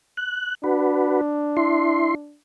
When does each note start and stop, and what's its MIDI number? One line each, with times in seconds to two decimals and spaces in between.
0.17 0.55 90
0.64 2.37 62
0.64 1.21 66
0.64 1.21 71
1.57 2.15 64
1.57 2.15 84